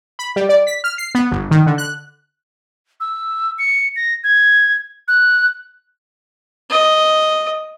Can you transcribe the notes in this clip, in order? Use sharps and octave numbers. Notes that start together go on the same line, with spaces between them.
B5
G3
D5
B6
F6
C7
B3
G1
D#3
D3
F#6
E6
C#7
A#6
G#6
F#6
D#5